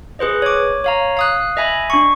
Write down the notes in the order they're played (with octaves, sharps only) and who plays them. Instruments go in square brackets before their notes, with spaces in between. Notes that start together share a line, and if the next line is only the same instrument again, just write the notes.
[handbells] G#4 B4 C5 D#5
C#5 D6
C#5 F5 A#5
F5 D#6 F#6
D#5 E5 G#5 B5
D4 C#6